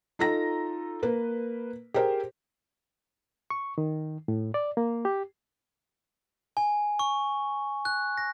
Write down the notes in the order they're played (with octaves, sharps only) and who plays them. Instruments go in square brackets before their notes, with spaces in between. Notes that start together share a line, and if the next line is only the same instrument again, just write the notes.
[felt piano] D#4 F4 A4 A#5 A#6
A#3 B4
G4 G#4 A#4 C5
[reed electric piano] C#6
D#3
A2
D5
A#3
G4
[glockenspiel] G#5
C#6
F#6
A#6